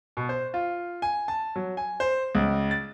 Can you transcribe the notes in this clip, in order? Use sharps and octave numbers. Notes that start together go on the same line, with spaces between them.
B2
C5
F4
G#5
A5
F#3
G#5
C5
C#2
A6